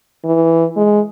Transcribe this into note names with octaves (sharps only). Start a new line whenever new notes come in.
E3
G#3